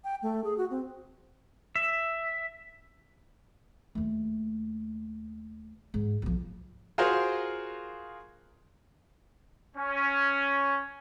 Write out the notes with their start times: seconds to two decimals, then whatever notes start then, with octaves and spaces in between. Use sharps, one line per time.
0.04 G5
0.22 A3
0.44 G#4
0.58 F#4
0.70 C4
1.76 E5
3.95 D#2 A3
5.94 G#2
6.22 B1 F3
6.98 F4 F#4 G#4 A#4 C5
9.76 C#4